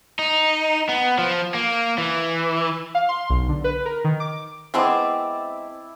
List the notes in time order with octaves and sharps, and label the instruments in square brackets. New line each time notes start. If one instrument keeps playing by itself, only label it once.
[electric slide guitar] D#4
B3
F3
A#3
E3
[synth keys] F5
C6
B1
D3
B4
A#4
D#3
D6
[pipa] G#3 B3 C4 [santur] E4 A5 D6